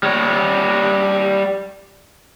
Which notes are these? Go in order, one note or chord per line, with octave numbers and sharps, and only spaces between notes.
G3 C#5